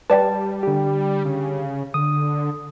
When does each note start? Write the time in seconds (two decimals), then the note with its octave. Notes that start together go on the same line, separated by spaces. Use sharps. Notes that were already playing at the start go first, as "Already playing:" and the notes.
0.10 G3 B4 D5 G5 A5
0.63 D3 G4
1.25 C#3
1.94 D3 D#6